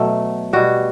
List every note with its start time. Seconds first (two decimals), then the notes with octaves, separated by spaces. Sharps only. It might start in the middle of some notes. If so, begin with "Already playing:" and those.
Already playing: B2 F#3 A3
0.53 B2 G3 F#4